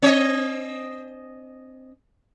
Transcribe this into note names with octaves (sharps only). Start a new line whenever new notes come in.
C4 D#5